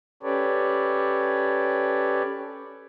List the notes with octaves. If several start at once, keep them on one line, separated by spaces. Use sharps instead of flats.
C#4 G4 A4 B4 C#5 D5